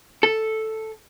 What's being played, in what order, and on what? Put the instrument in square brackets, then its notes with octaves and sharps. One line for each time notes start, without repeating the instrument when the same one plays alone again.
[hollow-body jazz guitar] A4